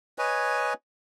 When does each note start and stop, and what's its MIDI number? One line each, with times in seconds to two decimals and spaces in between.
0.18 0.74 71
0.18 0.74 73
0.18 0.74 75
0.18 0.74 80